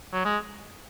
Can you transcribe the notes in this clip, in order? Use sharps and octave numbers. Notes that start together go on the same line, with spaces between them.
F#3
G#3